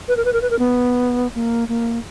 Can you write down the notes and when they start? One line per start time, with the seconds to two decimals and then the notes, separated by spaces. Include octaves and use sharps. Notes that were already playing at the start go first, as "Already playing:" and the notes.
0.08 B4
0.17 A#4
0.25 B4
0.33 A#4
0.42 B4
0.50 A#4
0.59 B3
1.35 A#3
1.69 A#3